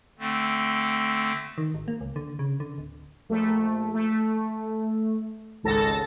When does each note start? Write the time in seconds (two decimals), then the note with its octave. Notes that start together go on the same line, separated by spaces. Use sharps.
0.19 D3 A3 C4
1.58 D#3
1.74 G#1
1.88 A#3
2.01 C#2
2.16 D3
2.39 C#3
2.60 D3
2.78 D1
3.29 A#1 A3
3.94 A3
5.63 G#1 C#2 A4 A5 A#6